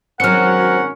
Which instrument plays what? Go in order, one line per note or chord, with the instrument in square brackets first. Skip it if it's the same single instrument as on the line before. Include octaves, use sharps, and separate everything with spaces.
[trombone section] G#1 C#4 A#4 [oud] F#3 C4 [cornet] F#5 [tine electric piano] F6 C#7